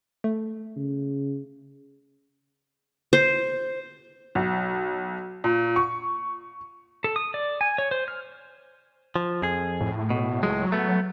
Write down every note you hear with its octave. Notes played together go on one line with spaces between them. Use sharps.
A3
C#3
C5
B1
A#2
C#6
A4
D#6
D5
G#5
C#5
C5
F6
F3
F2 G#4
A2
B2
C#2 A2 F#3 G#3
A3 B3